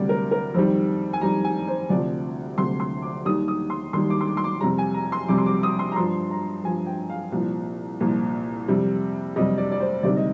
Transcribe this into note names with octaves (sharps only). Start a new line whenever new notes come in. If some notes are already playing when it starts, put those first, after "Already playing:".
Already playing: D2 C3 G3 D5
A#4
A#4
F2 D#3 G3 C5
G#5
F2 D#3 G3 A#5
G#5
C5
D2 C3 F3 D5
D2 C3 F3 C6
C6
D6
D#2 D#3 G3 D#6
D#6
C6
D#2 D#3 G3 C6
D6
C6
D6
C6
D6
F2 C3 G3 A#5
G#5
A#5
C6
F2 C3 G3 D6
C6
D6
D#6
C6
A#5
G2 F3 C6
A#5
G2 F3 G#5
G5
F5
C2 A#2 F3
C2 A#2 F3
F2 C3 G3
F2 C3 G3 D#5
D5
D5
C5
D2 C3 D#3 G3 D5
D#5